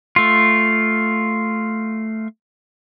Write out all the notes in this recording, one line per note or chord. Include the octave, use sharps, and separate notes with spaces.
A3 F4